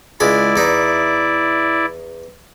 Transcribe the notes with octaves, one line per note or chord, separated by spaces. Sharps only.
C#2 G#3 E4 D5 B5
E2 D#4